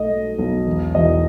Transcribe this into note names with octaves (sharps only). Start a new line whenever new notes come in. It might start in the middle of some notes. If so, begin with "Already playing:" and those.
Already playing: B1 A3 D#5
A3
B1
E1
E1 D#5